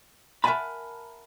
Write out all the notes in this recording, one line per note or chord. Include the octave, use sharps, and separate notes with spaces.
A#4 E5 F#5 G#5 A5 B5